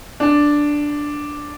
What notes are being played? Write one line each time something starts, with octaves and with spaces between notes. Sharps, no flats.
D4